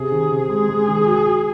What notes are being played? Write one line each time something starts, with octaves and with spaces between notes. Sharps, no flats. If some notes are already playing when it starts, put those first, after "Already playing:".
Already playing: C3 G#4
D#3
C3
G#3 G#4
G#3
D#3
F#4
F#4